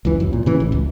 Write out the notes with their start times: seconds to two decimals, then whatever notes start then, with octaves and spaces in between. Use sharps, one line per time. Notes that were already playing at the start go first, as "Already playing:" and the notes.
0.05 C#2 F#2 E3
0.20 F#2
0.33 A#2
0.46 C#3 E3
0.60 A1
0.72 C#2